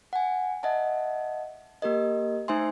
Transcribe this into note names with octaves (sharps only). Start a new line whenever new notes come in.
F#5 G#5
D#5 E5 F#5 A5
A#3 G4 A#4 D#5
A3 D#4 C5 E5 G#5 C6